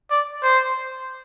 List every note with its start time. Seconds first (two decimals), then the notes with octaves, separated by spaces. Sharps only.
0.11 D5
0.43 C5